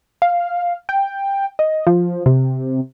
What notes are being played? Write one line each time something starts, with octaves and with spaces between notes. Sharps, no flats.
F5
G5
D#5
F3
C3